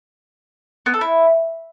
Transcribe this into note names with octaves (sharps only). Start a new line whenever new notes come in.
B3
A4
E4